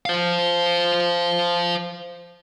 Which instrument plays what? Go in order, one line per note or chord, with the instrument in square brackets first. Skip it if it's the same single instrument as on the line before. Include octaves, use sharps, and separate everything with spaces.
[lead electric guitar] C5 F5